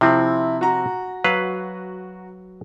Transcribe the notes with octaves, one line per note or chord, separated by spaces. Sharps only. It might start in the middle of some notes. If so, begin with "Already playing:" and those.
C3 F3 C4 E4
F#4 A#5
F#3 B4 F5